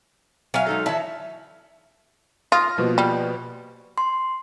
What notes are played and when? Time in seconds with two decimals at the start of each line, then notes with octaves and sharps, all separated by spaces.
0.54 F#3 E5 F5 G#5
0.66 G#3 D#4 A4
0.86 E3 E4 E5 A5
2.52 F4 D#6 F6 A#6
2.78 B2 F3 A#3
2.98 G3
3.98 C6